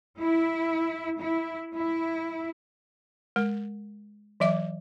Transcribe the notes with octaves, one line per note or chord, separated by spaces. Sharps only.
E4
E4
E4
G#3 A#4
E3 F#3 E5 D6